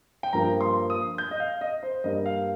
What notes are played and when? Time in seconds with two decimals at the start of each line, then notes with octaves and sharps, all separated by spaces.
0.23 G5
0.33 G2 F3 A#3 A#5
0.61 C6
0.90 D#6
1.18 G6
1.31 D#5
1.40 F5
1.61 D#5
1.83 C5
2.04 G2 G3 A#3 D#5
2.26 F5